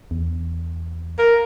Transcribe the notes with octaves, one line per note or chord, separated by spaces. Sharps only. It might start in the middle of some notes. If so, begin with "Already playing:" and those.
E2
A#4